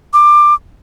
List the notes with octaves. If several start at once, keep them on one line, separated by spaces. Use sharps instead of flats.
D6